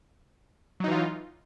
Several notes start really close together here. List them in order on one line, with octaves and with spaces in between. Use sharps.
F#3 D#4 E3 F4